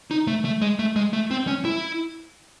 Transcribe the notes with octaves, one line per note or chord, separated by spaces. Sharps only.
D#4
A3
A3
G#3
A3
G#3
A3
C4
C#4
E4